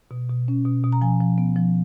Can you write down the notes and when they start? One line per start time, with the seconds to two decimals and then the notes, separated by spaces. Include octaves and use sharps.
0.11 B2
0.30 B2
0.48 C#4
0.65 B2
0.84 B2
0.92 A#5
1.01 F3 G#5
1.20 F3
1.38 B3
1.56 F3